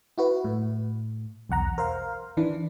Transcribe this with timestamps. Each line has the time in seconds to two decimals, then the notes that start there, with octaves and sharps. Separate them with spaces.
0.18 E4 F#4 B4
0.45 A2
1.49 B1 E2 F#5 A#5
1.78 A#4 C5 F5
2.37 D#3 E3 D4 B4